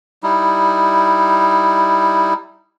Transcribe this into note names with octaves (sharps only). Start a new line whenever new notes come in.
G3 D#4 E4